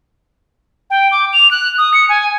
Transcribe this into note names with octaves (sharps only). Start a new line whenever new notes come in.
G5
D6
F7
F#6
D#6
C#7
G#5